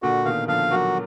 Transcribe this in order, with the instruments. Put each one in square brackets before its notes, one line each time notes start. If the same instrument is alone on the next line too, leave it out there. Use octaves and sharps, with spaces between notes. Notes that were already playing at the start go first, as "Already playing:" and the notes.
[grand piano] A#2 D3 [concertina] F#4
[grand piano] B2 D#3 [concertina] F5
[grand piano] D3 F3 [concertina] F5
[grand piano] F#3 A#3 [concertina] F#4